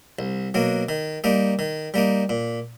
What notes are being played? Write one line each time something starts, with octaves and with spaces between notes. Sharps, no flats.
C2
B2 F#3 A#3
D#3
G3 A#3 D#4
D#3
G3 A#3 D#4
A#2